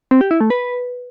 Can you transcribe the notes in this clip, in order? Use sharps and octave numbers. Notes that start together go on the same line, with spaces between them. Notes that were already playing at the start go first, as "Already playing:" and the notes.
C4
G4
E4
A3
B4